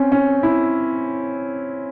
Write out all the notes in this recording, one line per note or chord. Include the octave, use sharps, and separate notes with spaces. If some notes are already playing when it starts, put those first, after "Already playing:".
Already playing: C4 C#4
C#4
E4